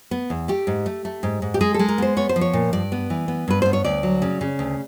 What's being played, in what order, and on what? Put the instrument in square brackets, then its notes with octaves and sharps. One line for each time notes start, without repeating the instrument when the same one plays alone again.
[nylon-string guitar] B3
E2
A3 G4
G#2
A3
A3
G#2
G#2
G4
G#3 G#4
G#3 A4
A#4
B3 C5
B3 C#5
C5
F3
C#5
A#2
G2 D5
B3
E3
B3
G2 B4
B3 C5
C#5
D2 D5
F#3
C#3
C#3
D2